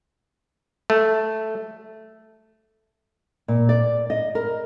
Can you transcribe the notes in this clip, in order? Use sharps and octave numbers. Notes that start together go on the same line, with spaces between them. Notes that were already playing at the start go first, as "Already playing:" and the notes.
A3
A#2
D5
D#5
A#4